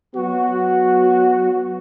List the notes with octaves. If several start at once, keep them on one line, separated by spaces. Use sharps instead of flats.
F#3 B3 F#4